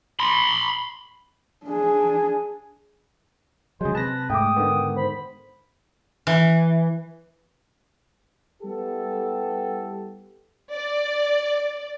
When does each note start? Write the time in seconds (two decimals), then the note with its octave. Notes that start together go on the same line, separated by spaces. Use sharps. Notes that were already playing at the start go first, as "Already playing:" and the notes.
0.20 B5 C6
1.65 D4 G#4
3.81 C#3 F#3 G#3 G#4 C5
3.95 C3 B4 A5 A#6
4.30 G#2 A3 G5 D6 D#6
4.56 D3 D#3 B3
4.97 C5 B5
6.27 E3
8.62 G3 B3 E4 G4 A4
10.73 D5